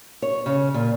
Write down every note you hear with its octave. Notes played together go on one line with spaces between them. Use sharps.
C#5
C#3
A#2